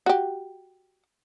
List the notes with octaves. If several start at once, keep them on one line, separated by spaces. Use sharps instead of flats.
F#4 G4